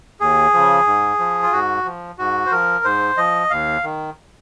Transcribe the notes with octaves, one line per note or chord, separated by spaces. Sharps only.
D#2 G#4
C#3 F3
G#2
F3
F4
G#2 F#4
F3
G#2 F#4
C5
F3 A#4
G#2 C5
F3 D#5
D#2 F5
D#3